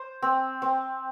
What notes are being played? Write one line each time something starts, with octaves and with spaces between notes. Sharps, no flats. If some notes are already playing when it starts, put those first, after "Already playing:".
Already playing: C5
C4
C4